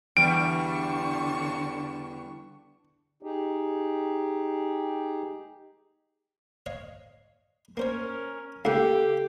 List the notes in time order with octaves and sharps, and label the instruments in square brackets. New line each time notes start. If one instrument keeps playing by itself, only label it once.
[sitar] E2 G3 [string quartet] D3 D4 C#6 [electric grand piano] D7
[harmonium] D#4 G4 G#4
[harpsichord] C#5 D#5 F5
[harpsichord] A#3 C5 C#5 [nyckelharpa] C#4 A#4
[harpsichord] C#2 A#3 F#5 [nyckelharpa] G4 [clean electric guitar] A4 F5